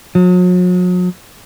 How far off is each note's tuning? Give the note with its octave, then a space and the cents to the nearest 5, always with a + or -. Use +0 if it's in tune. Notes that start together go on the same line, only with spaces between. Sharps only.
F#3 -40